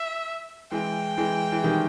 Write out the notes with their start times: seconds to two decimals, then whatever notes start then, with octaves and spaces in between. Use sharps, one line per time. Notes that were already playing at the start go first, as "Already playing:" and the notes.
Already playing: E5
0.72 E3 G#3 G5
1.18 E3 G#3
1.52 E3
1.63 D#3 G3